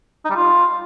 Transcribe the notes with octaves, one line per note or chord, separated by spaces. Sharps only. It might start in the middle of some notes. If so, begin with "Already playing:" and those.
D#4
G3
F4